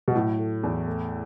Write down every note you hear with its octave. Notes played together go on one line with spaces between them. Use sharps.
B2
A2 F#3
A3
E2
A3